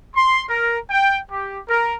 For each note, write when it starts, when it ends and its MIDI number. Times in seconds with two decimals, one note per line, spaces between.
0.15 0.45 84
0.49 0.77 70
0.90 1.17 79
1.30 1.59 67
1.68 1.96 70